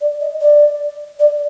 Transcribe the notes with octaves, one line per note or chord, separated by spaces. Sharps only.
D5
D#5
D5
D5